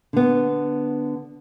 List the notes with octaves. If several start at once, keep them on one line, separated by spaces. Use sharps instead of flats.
D3 B3